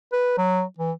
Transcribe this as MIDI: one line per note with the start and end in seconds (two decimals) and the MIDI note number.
0.13 0.38 71
0.38 0.63 54
0.78 0.92 52